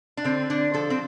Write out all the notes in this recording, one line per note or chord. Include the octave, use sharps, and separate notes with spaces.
D4
D3 C4
D3 D4
F3 A4
C4